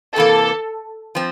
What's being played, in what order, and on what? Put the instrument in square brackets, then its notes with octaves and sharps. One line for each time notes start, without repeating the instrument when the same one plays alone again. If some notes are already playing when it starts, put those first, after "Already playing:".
[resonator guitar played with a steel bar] C3 E3 A#3 [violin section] A4
[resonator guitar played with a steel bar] F3 C4